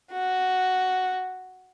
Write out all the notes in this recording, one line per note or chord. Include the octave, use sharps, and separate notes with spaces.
F#4